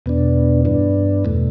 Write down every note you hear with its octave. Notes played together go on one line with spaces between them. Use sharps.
E2 B2 B3 D4
G2 E3 B3 D4
E2 B2 A3